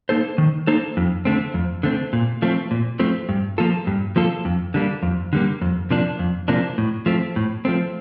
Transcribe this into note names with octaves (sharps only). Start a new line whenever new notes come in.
A#3 D#4 A4 C5
D#3
A#3 D#4 A4 C5
F2
D3 A3 C4
F2
D3 A3 C4
A#2
F3 A3 C4
A#2
F3 A3 C4
G2
F3 A#3 F4 A4
G2
F3 A#3 F4 A4
F2
D3 G3 A#3
F2
D3 G3 A#3
F2
C3 F3 A#3 D4
F2
C3 F3 A#3 D4
A2
F3 A3 C4
A2
F3 A3 C4